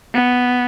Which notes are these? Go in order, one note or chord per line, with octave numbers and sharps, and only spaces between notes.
B3